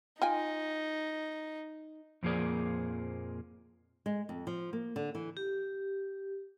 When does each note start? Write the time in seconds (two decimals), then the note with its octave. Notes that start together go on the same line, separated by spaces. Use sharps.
0.22 D#4 F4 G5 G#5
2.23 F2 A#2 F3 A#3 G#4 D5
4.06 G#3
4.29 F2
4.47 F3
4.73 A#3
4.96 D3
5.15 E3
5.37 G4